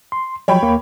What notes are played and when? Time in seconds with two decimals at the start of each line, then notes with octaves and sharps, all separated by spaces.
0.12 C6
0.48 F3 F#3 C#5 G5 B5
0.63 D#2 A#3